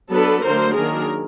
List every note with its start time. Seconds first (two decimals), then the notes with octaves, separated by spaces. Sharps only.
0.11 F#3 B3 D4 A4 B4
0.42 D3 F#3 A3 D4 A#4 C5
0.74 D#3 F#3 A#3 D4 G#4 A#4